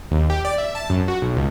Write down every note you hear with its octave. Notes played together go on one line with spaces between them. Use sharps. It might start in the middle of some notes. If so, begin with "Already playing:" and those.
D#2
G4
D5
E5
A5
F#2
F#4
B1
C#2